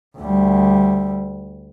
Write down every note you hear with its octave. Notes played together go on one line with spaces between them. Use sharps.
D2 G3